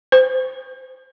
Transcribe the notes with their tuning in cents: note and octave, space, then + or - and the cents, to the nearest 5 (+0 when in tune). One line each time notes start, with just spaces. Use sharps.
C5 -30